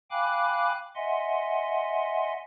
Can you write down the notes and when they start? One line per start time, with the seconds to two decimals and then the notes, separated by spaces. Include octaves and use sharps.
0.11 F5 G5 G#5 B5 D6 F#6
0.96 D#5 E5 F#5 G#5 C6